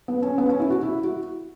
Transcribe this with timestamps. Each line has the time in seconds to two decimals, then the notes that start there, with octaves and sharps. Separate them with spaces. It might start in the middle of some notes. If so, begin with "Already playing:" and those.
0.08 B3
0.22 C#4
0.38 B3
0.49 C#4
0.60 E4
0.70 F#4
0.83 E4
1.04 F#4